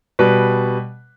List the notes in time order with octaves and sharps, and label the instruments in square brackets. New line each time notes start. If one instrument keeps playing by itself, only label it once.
[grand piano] B2 G3 B4